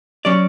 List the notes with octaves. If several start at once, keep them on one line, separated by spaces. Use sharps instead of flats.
F#3 C#4 D5